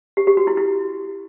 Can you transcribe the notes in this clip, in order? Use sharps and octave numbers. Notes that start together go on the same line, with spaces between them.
G4
G4
F#4
E4
E4